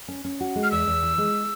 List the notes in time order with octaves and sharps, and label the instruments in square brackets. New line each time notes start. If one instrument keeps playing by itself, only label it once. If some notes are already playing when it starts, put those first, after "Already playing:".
[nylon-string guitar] C#4
C#4
F#4
G#3
[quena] F6
[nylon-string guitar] E2 [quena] E6
[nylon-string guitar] E2
E3
G#3